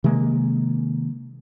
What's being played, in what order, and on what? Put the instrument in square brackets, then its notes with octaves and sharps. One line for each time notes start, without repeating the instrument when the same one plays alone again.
[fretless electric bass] C3 D#3 G#3 A#3